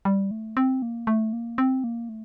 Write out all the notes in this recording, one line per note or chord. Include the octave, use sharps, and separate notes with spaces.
G3
A3
C4
A#3
A3
A#3
C4
A#3
A3